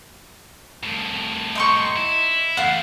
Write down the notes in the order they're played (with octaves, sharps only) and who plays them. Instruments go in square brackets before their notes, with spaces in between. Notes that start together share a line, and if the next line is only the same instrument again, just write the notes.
[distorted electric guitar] C2 A2
[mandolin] D#4 C6 C#6
[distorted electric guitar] E4
[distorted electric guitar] E2 A3 [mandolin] F5 F#5